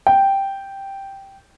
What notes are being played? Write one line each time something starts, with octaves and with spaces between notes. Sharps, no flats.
G5